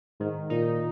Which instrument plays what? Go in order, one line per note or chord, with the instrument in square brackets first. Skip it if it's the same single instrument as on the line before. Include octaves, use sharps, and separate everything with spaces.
[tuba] G#2 [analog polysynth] D#3
[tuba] A#2 [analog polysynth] D#4